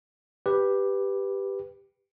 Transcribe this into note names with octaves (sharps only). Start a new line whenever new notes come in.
G4 B4